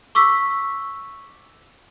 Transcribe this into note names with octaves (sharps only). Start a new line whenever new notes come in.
C#6 D6 E6 B6